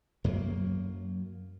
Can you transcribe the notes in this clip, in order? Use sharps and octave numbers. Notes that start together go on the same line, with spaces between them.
F#2 F#3 A#3